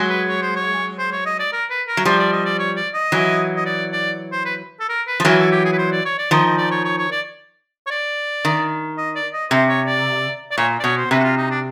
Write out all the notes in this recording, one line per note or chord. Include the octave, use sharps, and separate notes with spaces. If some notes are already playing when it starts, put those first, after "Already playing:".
Already playing: F#3 G#3
B4
C#5
C5
C#5
C5
C#5
D#5
D5
A#4
B4
A#4
F#3
F3 G3 C5
D5
D#5
D5
C#5
D5
D#5
E3 F#3
D#5
D5
D5
C5
B4
A4
A#4
B4
F3
E3 F#3 A#4
A4
G4
G#4
B4
C5
D5
C#5
D5
D#3 F3 D#5
D#5
D5
C#5
C#5
C#5
D5
C#5
D5
D#3
D#5
D5
D#5
C3 C5
C#5
D5
D5
A#2 C#5
D5
B2 C#5
C5
C3 B4
F#4
F4
D#4
D4